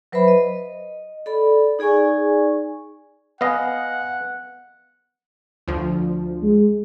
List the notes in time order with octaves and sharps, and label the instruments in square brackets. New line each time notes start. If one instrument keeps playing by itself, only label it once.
[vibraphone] F#3 B4 C5 E5 B5
D#5
A4 D5 B5
D#4 G#4 D5 G#5 C#6
[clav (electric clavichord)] B3 D#5 [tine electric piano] F5 G#5 [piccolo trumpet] F#5
[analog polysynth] D2 F3
[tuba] G#3